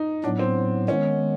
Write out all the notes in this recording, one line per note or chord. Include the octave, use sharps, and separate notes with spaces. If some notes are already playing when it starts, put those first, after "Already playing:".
Already playing: D#4
A2 F#3 B3 D4
C4
D#3 G#3 B3 C#4